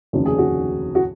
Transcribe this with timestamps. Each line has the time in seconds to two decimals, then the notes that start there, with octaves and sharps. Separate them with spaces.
0.13 F1 D#2 C#3 F#4
0.26 G#4
0.38 F#4
0.95 F#4